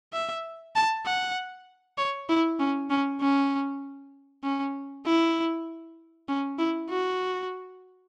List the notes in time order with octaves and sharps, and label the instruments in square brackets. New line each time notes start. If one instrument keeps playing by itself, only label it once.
[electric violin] E5
A5
F#5
C#5
E4
C#4
C#4
C#4
C#4
E4
C#4
E4
F#4